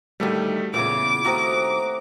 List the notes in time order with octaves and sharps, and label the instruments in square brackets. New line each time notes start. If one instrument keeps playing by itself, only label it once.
[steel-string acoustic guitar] D2 D#3 [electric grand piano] G3 A3 G4
[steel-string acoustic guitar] E2 C#3 [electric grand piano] A#2 [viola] D6
[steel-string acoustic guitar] D#2 [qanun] A3 C4 [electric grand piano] F#4 A#5 D#6